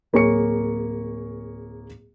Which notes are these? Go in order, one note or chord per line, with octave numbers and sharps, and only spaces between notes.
D1 A#3 G#4 C#5 C#6 C#7